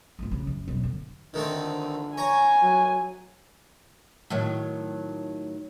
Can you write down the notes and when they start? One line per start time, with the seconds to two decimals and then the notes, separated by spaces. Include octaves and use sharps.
0.19 F2 A2
0.31 C#3
0.47 F#2
0.68 E1 F#3
0.83 D3
1.34 D3 D#3 A3 C4
2.18 C#5 G#5 A#5
2.62 F#3
4.30 A2 D#3 F#3